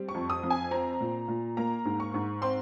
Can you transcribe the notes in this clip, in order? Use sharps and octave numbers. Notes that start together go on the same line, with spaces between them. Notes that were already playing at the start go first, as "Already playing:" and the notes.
Already playing: G3 C4
C#6
F2
D#6
F2
G#5
C4 A#5
A#2
A#2
A#3 A#5
G#2
C#6
G#2
C4 C6